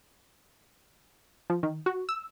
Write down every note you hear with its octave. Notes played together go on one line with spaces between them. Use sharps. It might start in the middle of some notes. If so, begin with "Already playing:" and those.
F3
D#3
F#4
E6